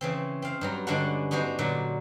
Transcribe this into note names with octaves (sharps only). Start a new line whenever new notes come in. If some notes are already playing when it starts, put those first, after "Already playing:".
C#3 E3 C4
C4 F5
G2 F#3 A#5
G2 D3 G#3 C#4 D4 F#5
B3 D4 D#4 F#4 C5
A#2 D3 F#3